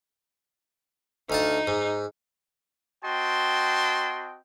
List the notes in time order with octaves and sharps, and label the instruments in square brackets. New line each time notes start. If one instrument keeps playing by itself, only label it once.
[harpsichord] D2 F5 A5 [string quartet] D#4
[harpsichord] G#2
[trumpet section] C4 F#4 D#5 G5 A5 C6